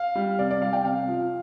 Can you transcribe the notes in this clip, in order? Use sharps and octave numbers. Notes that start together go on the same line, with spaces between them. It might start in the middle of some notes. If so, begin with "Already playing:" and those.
Already playing: F5
G3
C3 D5
D5
G3 F5
G5
C3 F5
F3